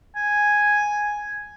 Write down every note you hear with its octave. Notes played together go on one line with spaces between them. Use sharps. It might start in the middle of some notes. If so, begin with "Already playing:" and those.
G#5